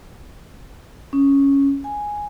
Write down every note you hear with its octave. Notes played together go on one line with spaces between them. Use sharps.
C#4
G#5